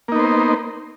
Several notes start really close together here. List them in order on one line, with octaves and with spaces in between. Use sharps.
A#3 D#4 B3 C5